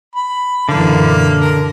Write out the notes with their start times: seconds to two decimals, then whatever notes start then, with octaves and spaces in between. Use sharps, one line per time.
0.15 B5
0.69 F#2 A#2 D3 E3 A#3
1.40 A#4